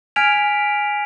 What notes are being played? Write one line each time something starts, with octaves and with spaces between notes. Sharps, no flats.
G#5 F6 G#6 B6 D7 F7